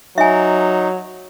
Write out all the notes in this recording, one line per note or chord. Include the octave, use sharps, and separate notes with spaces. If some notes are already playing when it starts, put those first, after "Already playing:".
F#3 D#4 E5 G#5